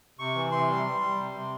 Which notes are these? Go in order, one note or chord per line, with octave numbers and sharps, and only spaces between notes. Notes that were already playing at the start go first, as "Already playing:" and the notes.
C3 C#6
E3
C3 C6
G3
G3
G3
C3
C3